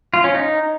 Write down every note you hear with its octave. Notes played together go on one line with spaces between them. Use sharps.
F4
C#4
D#4